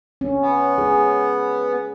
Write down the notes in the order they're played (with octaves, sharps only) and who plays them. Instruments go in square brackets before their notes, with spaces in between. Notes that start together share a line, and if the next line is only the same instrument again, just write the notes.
[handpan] C#4
[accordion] B3
[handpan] G#4